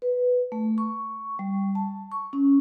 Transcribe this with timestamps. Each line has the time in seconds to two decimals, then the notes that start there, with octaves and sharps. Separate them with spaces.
0.02 B4
0.52 A3
0.78 C#6
1.39 G3
1.75 A5
2.12 C#6
2.33 C#4